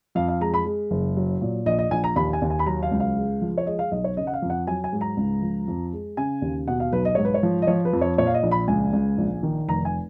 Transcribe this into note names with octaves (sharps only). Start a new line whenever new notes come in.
F2 F5
F5
G#3 A#5
B5
G#3
F#1
F#3
A#2
A#1 D#5
D#5
A#1 G#5
A#5
D#2 B5
G#5
D#2
G#5
B5
F#3 A#5
F5
C#2
F5
G#3
F3
C#5
G#3 D#5
F5
B1 D#5
C#5
C#3 D#5
F#5
F5
F2
F#5
F#3 G#5
G#5
G#2
A#5
C#2
F3
F2
G#3
C#3 G#5
D#2
B2 F#5
F5
B1 B4
D#5
G#2 C#5
B4
C#5
F3
D#5
F3 C#5
B4
F2
C#5
A#2 C#5
F5
D#5
A#1
B5
C#2 G#5
C#2
A#1
D#3
F1 A#5
G#5